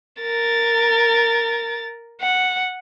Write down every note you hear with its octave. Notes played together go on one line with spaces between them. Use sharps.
A#4 A6
F#5